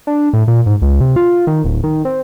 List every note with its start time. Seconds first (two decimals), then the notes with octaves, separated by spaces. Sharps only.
0.07 D4
0.33 A2
0.47 A#2
0.66 G#2
0.82 C#2
1.01 C3
1.16 F4
1.47 D#3
1.64 D1
1.83 D#3
2.05 C4